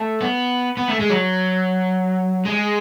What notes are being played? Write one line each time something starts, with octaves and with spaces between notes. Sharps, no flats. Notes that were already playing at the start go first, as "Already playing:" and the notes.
Already playing: A3
B3
B3
A3
G#3
F#3
G#3